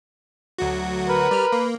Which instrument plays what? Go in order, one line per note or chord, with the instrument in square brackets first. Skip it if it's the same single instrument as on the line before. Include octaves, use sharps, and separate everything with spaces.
[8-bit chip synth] D2 F#3 F#4
[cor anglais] A#4 [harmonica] B4
[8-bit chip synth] G3 F6
A#3